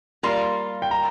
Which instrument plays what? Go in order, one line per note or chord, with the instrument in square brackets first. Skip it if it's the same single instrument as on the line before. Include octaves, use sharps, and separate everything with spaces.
[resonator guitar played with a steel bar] G3 A#3 F4 A#4 [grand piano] C6
[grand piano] G5
A#5